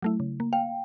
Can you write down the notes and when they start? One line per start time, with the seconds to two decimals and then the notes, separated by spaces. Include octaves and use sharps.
0.02 F#3 A3 E4
0.20 C#3
0.40 A#3
0.53 F5 G5